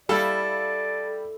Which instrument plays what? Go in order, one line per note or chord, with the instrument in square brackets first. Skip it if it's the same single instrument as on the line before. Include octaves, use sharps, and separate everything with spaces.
[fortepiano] G3 [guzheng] E4 F5 [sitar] A4 [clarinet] D5